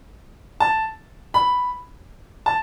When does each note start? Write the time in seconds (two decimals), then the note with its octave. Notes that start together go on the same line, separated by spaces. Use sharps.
0.60 A5
1.34 B5
2.46 A5